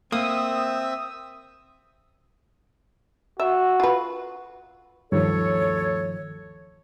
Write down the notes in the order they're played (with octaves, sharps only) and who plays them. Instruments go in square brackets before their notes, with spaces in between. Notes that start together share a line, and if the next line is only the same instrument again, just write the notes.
[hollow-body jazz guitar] A#3 [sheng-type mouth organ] C4 E5 [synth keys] D#6
[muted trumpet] F#4 [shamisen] E5
[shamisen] F4 B4
[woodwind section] D2 A4 C#5 [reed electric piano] G2 D#3 F3